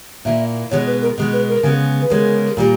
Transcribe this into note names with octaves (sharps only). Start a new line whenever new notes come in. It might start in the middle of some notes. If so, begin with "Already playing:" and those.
A#2 A#3 E4 E5
B2 G#3 B3 C#5
B4
A#4
B2 G#3 B3
B4
A#4
C#3 G#3 B3
B4
C#3 G#3 B3 A#4
A#2 G3 A#3